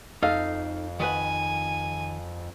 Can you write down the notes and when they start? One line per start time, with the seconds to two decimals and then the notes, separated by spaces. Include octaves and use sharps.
0.23 F2 D#4 A4 F5
1.00 D#3 B4 F#5 G#5